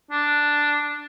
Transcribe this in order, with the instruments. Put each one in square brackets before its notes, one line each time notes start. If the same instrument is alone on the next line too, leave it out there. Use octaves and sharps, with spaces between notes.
[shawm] D4